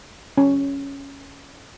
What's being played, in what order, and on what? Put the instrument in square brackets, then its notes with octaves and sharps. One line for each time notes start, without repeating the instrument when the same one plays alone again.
[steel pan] C#4